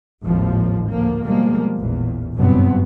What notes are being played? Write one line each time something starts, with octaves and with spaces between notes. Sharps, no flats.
G#1 D#2 A2 D#3 F3
D2 F3 A#3
B2 F3 G3 G#3 A#3
A1 E2 A#2
F#1 G2 B2 F#3 B3 C4